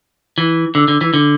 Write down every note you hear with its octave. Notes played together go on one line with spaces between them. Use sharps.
E3
D3
D3
E3
D3